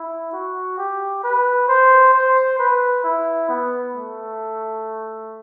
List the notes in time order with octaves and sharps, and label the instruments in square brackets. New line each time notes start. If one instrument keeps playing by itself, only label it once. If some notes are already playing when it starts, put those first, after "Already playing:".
Already playing: [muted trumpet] E4
F#4
G4
B4
C5
C5
B4
E4
B3
A3